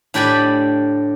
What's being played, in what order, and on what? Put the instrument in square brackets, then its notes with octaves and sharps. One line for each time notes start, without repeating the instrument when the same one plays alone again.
[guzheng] A2 D4 G4 D5 G#5 B5